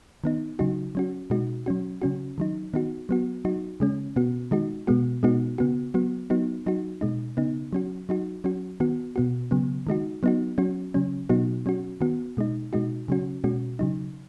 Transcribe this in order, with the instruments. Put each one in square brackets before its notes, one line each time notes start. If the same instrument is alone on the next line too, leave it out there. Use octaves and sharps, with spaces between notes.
[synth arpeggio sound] D#3 B3 D#4
C#3 F#3 D#4 F#4
F#3 C#4 F#4
B2 G#3 D#4 F#4
F#3 C#4 F#4
C#3 F#3 C#4 F#4
D#3 F#3 D#4
D#3 B3 D#4 F#4
F#3 B3 F#4
F#3 D#4 F#4
C#3 G#3 C#4
B2 B3 F#4
D#3 G#3 D#4 F#4
B2 G#3 B3 F#4
B2 G#3 B3 D#4 F#4
C#3 B3 F#4
F#3 B3 F#4
F#3 B3 D#4 F#4
F#3 D#4 F#4
B2 G#3 D#4
C#3 B3 D#4
F#3 C#4 F#4
F#3 D#4 F#4
F#3 C#4 F#4
D#3 B3 F#4
B2 B3 F#4
C#3 F#3 B3
D#3 G#3 D#4 F#4
F#3 B3 D#4 F#4
F#3 C#4 F#4
C#3 F#3 C#4
B2 F#3 B3 D#4 F#4
F#3 C#4 F#4
D#3 B3 F#4
B2 G#3 D#4
B2 G#3 D#4 F#4
C#3 F#3 C#4 F#4
B2 G#3 C#4 F#4
C#3 F#3 D#4